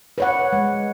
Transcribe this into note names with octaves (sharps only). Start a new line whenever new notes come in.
B4 C#5 F#5
G#3